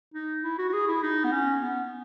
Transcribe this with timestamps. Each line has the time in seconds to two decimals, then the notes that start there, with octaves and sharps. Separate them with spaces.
0.14 D#4
0.44 E4
0.58 F#4
0.69 F#4
0.73 G#4
0.88 E4
1.03 D#4
1.24 B3
1.33 C#4
1.62 B3